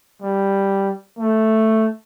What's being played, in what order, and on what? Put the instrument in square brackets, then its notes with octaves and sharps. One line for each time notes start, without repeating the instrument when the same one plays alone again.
[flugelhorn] G3
A3